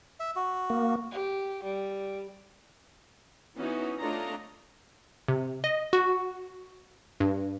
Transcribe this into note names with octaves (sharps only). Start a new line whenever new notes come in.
E5
F#4
A#3
G4
G3
E3 B3 C#4 D#4 E4 F#4
A3 D4 F4 C#5 D#5 A#5
C3
D#5
F#4
G2